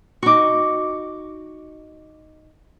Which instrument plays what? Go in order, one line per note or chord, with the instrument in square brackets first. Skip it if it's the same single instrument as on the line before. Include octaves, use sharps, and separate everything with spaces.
[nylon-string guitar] D#4 F#4 [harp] C#6 D6